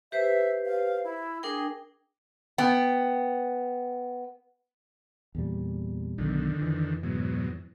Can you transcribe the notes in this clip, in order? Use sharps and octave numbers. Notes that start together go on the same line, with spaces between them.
G4 B4 C5 E5
F5
E4
D4 G#4 A#4 G5
B3 G5
E2 A#2 G3
B1 F#2 B2 D3 D#3
F2 E3
G#2 B2 F#3